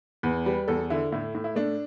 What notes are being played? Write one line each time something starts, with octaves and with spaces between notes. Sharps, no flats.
E2 B4
G3 B4
E2 A4
D3 E4
A2 E4
A2
E4
A3 D4